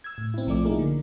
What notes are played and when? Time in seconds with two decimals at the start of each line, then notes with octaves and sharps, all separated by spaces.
0.04 E6 G#6
0.18 A2
0.34 C4 E4
0.47 B1 F3 A3 D5 D6
0.65 A#3 D#4 E4 G#4 A#4
0.79 D3